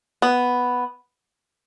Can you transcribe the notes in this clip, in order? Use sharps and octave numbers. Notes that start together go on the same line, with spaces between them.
B3